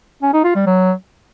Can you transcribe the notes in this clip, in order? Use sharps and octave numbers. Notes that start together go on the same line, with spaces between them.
C#4
D#4
F4
G3
F#3